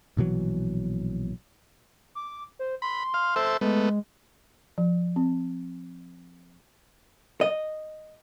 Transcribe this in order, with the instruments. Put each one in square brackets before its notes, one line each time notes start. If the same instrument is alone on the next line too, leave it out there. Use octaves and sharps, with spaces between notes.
[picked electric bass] A#1 B2 E3 F#3
[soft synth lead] D6
C5
[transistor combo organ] B5 [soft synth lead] C6
[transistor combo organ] F5
A4 C5 E5
[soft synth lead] G#3 [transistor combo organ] A3 B3
[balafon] F3
C4
[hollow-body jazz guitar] D#5